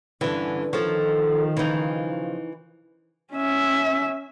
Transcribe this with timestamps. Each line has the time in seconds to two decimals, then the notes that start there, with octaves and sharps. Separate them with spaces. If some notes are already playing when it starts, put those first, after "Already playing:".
0.21 G2 D3 E3 C#4
0.73 D#3 F3 A4 C#5
1.57 C#3 E3 F3 D#4
3.32 C#4 E5